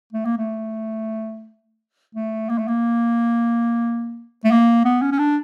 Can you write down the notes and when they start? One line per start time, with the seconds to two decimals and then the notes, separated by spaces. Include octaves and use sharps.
0.13 A3
0.25 A#3
0.37 A3
2.15 A3
2.49 A#3
2.58 A3
2.68 A#3
4.44 A3
4.51 A#3
4.85 B3
5.02 C#4
5.12 C#4
5.19 D4